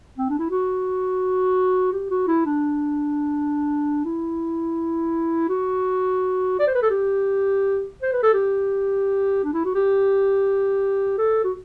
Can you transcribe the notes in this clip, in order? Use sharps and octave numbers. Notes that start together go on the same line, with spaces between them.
C4
D4
E4
F#4
G4
F#4
E4
D4
E4
F#4
D5
C5
B4
A4
G4
C5
B4
A4
G4
D4
E4
F#4
G4
A4
F#4